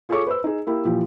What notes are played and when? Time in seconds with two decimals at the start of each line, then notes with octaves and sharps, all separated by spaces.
0.09 F4 G#4 A4 C#5 C#6 D6
0.27 B4 C5 E6
0.44 D#4 G#4
0.67 A#3 E4 G4
0.85 A#2 E3 F3 G4